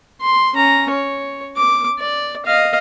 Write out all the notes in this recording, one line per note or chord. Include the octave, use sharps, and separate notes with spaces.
C6
C#4 A#5
C#5
D6
D5
D#5 F5